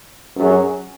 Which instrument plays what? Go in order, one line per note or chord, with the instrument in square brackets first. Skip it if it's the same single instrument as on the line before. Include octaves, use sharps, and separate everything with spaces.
[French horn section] F#2 F#3 C#4 G#4